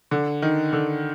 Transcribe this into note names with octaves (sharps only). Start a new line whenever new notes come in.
D3
D#3
D3